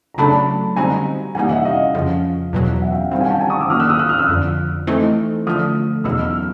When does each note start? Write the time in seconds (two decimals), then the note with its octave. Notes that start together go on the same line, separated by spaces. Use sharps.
0.14 A#5
0.18 C#3 F#3 A3 D4 A5 B5
0.76 D3 G3 C4 D#4 F#4 G#5 A#5
1.35 C3 E3 G3 A#3 D#4 F#5 G#5
1.50 E5 F#5
1.65 D#5 F5
1.94 F2 C#3 F3
2.53 E2 B2 F#3
2.82 E5 F#5
2.92 F5 G5
3.11 D#3 G3 C4 F5 G5
3.21 F#5 G#5
3.30 G5 A5
3.40 G#5 A#5
3.50 C#6 D#6
3.60 D6 E6
3.70 D#3 F#3 A#3 D4 D#6 F6
3.80 E6 F#6
3.90 D#6 F6
3.99 E6 F#6
4.09 D#6 F6
4.18 E6 F#6
4.29 F2 D3 F3
4.87 E3 A3 C4 D#4
5.47 D3 F3 A3 D#6 F6
6.04 E2 B2 F#3 B3 D#4 E6
6.13 F6
6.22 E6
6.31 F6